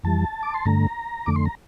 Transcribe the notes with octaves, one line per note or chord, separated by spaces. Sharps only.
F2 E3 G3 A5
D6
C6
G2 D3 A3 A#5
F2 D3 A3 D6
C6
A#5